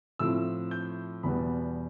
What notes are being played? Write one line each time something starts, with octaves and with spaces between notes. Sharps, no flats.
A2 F3 C4 E6
G6
E2 B2 G3 B3 B5